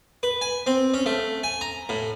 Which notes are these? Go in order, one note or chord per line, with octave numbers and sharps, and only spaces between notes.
B4
G#5
C4
C#4
A3
G#5
A#5
A2